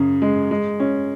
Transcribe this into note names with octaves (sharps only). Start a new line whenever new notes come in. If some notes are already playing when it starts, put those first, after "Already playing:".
Already playing: F#2 C#3
G#3
G#3
C#4